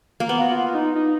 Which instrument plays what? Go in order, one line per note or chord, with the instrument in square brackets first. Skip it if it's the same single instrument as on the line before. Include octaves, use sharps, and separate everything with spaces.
[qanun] A#3
B3
[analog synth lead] F#4
F4
D#4
D#4